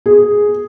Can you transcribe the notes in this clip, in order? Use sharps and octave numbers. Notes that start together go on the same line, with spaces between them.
G#4